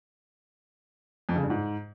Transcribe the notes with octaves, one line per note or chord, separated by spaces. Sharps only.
F2
C#3
G2
G#2